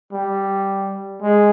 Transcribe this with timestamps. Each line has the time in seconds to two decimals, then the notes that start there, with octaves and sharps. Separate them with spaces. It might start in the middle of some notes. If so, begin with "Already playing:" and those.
0.12 G3
1.22 G#3